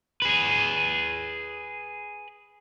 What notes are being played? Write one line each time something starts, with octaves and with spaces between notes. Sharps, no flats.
G#4 B4